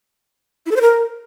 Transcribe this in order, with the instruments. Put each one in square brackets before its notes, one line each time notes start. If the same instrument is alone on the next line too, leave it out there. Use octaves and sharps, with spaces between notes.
[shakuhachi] E4
A4
C5
A#4